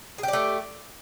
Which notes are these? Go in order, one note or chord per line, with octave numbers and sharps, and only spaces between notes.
A3 G4 G#4 D5